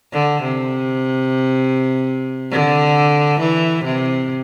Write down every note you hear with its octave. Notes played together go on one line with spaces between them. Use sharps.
D3
C3
D3
E3
C3